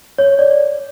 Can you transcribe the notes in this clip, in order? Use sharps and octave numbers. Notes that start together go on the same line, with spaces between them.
C#5
D5